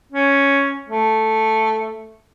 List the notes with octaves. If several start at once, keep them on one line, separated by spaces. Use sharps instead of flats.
C#4
A3